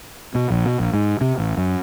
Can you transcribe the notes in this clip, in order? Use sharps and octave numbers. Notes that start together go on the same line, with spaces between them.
B2
A#1
B2
A#1
G#2
C3
A1
F#2